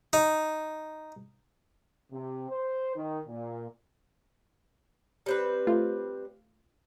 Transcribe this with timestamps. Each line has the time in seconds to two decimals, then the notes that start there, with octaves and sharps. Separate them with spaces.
0.13 D#4
2.12 C3
2.50 C5
2.95 D#3
3.27 A#2
5.26 G3 C4 B4
5.67 A3 F4